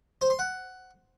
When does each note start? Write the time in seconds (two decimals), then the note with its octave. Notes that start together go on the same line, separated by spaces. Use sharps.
0.21 C5
0.30 C6
0.39 F#5